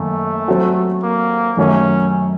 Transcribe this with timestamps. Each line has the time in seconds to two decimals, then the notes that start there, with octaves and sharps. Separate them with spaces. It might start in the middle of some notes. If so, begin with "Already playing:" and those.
Already playing: F#2 D#3 A3 A#3
0.48 F#3 C4 F#4 A4
1.03 A#3
1.57 F#2 D#3 F#3 A3 C#4